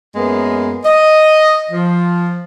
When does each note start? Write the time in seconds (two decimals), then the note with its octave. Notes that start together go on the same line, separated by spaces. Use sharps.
0.15 F#2 G#3 A#3 B3
0.85 D#5
1.72 F3